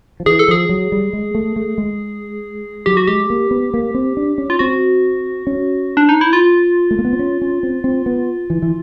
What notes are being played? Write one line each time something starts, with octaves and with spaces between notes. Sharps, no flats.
F3
E3 G#4
A4
F3 G#4
F#3
G3
G#3
A3
A3
G#3
F#3 G4
F#4
G#3 G4
A#3
B3
A#3
C4
D4
C#4
F4
C4 F#4
C#4
D4
D#4
E4
F4
A3
A#3
B3
C4
C#4
C#4
C4
C4
B3
E3
E3